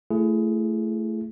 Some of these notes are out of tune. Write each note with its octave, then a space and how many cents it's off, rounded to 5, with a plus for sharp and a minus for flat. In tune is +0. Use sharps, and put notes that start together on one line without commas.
A3 +5 E4 +35 G#4 +15